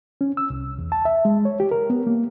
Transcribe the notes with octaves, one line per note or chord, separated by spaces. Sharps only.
C#4
E6
C2
E2
A5
E5
G#3
C#5
G4
A#4
B3
A#3